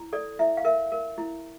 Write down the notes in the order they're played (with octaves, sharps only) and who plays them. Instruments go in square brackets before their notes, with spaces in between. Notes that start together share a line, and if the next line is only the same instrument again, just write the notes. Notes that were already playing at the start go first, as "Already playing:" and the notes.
Already playing: [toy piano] E4
A4 D5
E4 E5
F5
A#4 E5
A#4
E4